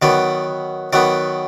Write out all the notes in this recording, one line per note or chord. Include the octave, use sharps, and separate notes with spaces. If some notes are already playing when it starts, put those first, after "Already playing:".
D#3 F#3 B3 D5
D#3 F#3 B3 D5